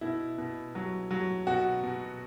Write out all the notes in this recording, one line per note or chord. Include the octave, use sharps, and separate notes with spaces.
B2 E4
B2
F#3
F#3
B2 F#4
B2